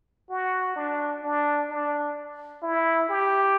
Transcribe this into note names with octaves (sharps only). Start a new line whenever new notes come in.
F#4
D4
D4
D4
E4
G4